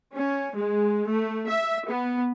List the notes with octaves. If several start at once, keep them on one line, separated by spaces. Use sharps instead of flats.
C#4
G#3
A3
E5
B3